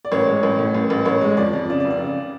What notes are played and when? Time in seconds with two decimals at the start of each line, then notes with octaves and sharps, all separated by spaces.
0.05 D5
0.12 A1 C#5
0.27 G#3
0.43 A1
0.58 A2
0.74 A1
0.90 A1
1.05 A1 C#5
1.21 G#3
1.37 F2 D5
1.53 F2
1.70 C#3 D5
1.80 D5
1.84 F1
1.90 D5
2.00 C#3